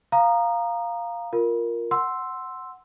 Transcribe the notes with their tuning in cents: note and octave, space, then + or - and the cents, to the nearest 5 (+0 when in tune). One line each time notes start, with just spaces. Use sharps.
F5 +0 A#5 +0 D#6 -25
F4 +0 A#4 +0
F#5 +0 C6 +0 E6 +0